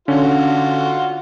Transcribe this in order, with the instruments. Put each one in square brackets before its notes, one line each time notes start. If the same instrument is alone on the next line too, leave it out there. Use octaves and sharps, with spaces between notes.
[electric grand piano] D3 C#4 [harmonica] F4 F#4